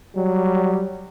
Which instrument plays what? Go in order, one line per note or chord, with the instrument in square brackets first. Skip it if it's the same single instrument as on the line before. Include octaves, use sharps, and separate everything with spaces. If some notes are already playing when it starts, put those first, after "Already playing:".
[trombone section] F#3 G3